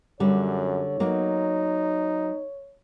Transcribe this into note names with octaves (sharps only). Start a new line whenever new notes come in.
F#2 D3 G3 C#5
F#3 A#3 D#4